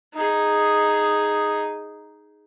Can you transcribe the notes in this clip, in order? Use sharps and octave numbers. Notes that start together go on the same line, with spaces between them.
D#4 G#4